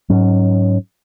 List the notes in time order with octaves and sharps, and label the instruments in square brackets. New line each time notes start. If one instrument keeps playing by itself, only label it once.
[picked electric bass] G#2 F#3 C#4